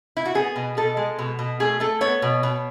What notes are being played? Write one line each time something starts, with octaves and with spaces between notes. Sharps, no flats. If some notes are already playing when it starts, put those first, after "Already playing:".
E4
F#4
B3 G#4
B2
B2 A4
G#3
B2
B2
A3 G#4
A3 A4
B3 C#5
B2
B2